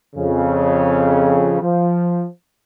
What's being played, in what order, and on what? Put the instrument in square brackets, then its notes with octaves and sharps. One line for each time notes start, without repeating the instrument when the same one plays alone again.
[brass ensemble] F2 C#3
F3